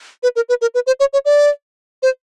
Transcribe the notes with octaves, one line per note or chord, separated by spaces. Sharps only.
B4
A#4
B4
A#4
B4
C5
C#5
C#5
D5
C5